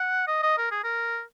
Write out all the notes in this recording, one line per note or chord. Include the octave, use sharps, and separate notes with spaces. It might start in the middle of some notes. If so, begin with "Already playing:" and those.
Already playing: F#5
D#5
D#5
A#4
G#4
A#4